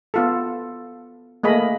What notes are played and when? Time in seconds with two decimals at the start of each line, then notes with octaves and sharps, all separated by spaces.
0.14 B3 F4 A4
1.43 A3 A#3 G#4 D#5 B5